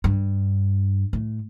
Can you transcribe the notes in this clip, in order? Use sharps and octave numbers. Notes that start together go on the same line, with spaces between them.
G2
A2